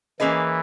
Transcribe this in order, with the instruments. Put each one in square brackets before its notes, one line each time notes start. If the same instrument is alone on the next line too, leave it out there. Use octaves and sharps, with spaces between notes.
[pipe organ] E3 [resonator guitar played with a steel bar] A#3 C#4 G#4 B4 D#5